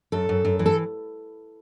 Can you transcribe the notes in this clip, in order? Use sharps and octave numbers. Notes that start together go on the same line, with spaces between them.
F#2 A4
F#2
F#2
E3
A4